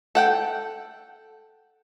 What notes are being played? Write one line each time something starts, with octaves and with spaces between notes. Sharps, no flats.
A4 F#5 G5